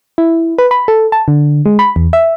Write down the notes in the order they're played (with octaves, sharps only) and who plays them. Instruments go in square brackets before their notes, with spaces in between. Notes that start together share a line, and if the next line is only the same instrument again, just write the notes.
[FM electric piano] E4
B4
B5
A4
A5
D3
G#3
B5
E2
E5